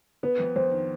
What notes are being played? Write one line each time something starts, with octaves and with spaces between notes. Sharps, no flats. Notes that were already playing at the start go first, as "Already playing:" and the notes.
B3 B4
F2
F2 C5
D#3